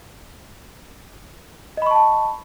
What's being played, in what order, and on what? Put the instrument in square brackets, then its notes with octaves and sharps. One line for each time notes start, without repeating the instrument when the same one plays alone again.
[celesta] D#5
B5
C#6
A5